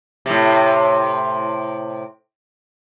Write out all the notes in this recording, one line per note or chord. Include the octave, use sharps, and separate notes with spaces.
A2 C3